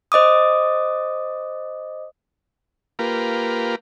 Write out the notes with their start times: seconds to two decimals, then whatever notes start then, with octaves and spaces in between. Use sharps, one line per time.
0.12 C5 D#5 D6 D#6
2.99 A#3 F4 G4 A#4 B4